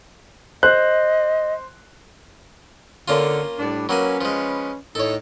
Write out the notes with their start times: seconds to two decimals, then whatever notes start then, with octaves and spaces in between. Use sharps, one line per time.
0.63 C5 D#5 F#6
3.08 D3 A#3 C#4 F4
3.58 A2 G3 D4
3.89 F#3 A#3 C#4 B4 G#5
4.21 F3 G#3
4.95 A2 D#4 A4 C#5